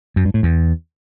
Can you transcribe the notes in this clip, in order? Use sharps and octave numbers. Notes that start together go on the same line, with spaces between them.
F#2
G2
A2
E2